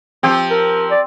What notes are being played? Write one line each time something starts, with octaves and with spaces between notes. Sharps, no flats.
F3 C4 G4
A#4
D5